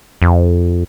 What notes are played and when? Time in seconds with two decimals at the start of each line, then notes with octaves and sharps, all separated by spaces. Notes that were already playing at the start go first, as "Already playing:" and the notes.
0.22 F2